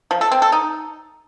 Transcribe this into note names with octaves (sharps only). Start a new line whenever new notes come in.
F3
A4
C4
A4
D#4